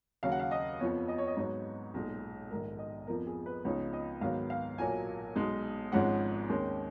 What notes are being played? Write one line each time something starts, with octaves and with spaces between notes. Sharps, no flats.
D#2 C#3 F#3 F5
F#5
F5
D#5
F2 F3 B3 C#5
D#5
C#5
D#5
G#2 F#3 B3 D#4 C#5
B1 A#2 G#3 D#4
A#1 G#2 D#3 A#4
D#5
F2 F3 B3 A#4
G#4
B4
C#2 C#3 F3 B3 D#4 C#5
D#5
G#2 D#3 F#3 B3 F5
F5
B1 A#2 F#3 A#3 G#5
B1 B2 G#3 D#4
G#1 G#2 F3 G#3 C#4 F#5
D#2 D#3 G#3 C#4